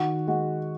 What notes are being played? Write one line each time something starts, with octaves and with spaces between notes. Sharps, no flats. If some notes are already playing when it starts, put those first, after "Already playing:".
Already playing: D#3 F#4
G#3 F#4